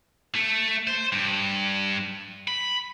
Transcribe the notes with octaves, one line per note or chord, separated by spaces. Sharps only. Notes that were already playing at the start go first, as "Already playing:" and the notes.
A3
C5
G2
B5